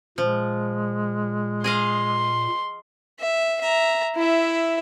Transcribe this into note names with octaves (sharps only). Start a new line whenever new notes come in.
A#2 F3 G#3
G#4 D#5 F5 C6
E5
E5 A#5
E4 E5